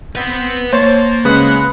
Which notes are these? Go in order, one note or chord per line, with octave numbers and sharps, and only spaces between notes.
C4 B4 F#5
A#3 C5 C#5 A5
C#3 G#3 B4 F#5 D#6